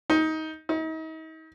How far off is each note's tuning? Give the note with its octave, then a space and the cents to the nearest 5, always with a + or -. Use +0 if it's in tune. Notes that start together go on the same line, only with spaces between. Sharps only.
D#4 +20
D#4 +40